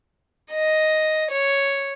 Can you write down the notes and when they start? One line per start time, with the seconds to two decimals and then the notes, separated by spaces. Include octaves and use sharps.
0.53 D#5
1.31 C#5